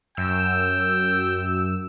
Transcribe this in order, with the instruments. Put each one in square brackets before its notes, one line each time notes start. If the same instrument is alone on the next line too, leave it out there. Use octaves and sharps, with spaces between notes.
[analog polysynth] F#2 E6 [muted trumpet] G5